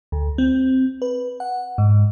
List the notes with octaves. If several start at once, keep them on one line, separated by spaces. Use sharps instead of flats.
D2
C4
B4
F#5
G#2